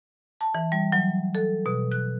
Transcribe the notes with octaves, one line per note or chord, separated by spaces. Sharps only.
A5
E3
G3
F#3
A4
B2
F#6